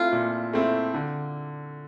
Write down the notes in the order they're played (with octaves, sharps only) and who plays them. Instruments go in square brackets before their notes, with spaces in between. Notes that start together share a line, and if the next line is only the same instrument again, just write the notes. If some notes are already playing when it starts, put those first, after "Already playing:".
Already playing: [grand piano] A3 C4 E4 [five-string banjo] F4
[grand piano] A#2
A3 C4 E4
D3